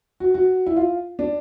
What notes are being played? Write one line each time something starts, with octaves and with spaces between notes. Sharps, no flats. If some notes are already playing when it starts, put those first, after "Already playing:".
F#4
F#4
E4
F4
D4